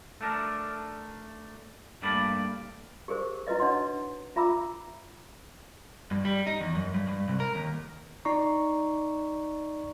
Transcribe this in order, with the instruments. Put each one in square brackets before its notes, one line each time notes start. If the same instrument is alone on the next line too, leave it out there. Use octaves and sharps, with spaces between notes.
[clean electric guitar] A3 D4 A#4
G2 A3 A#3 D5 B5
[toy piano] G4 G#4 A#4 C5
E4 F#4 B4 D#5 E5
D4 D#4 C#5 D#5 F#5 C6
F4 E5 A#5 B5 D6 E6
[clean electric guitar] G2
G3
D#4
E2
F#2
G2
G2
C2
A#4
D#2
[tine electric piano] D#4 D5 A#5 C#6